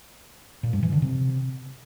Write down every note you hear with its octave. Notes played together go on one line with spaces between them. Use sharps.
A#2
G2
E3
D3
C3